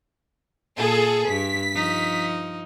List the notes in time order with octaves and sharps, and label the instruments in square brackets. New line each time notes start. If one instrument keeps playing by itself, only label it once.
[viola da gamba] A#2 [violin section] G#4 A4
[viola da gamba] G2 [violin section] B6
[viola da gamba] F3 D#4